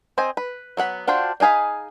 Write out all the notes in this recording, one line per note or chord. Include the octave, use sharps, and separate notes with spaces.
C4 D#5 G#5
B4
F#3 B3 F#5 B5
D4 F4 F#4 C5 G5
D4 D#4 G#4 F5 B5